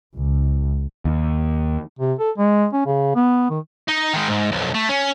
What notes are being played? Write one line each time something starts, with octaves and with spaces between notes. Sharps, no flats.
C#2
D#2
C3
A4
G#3
C#4
C#3
B3
D#3
D#4
D#3 G#3
G#2
B1 F2
A3
C#4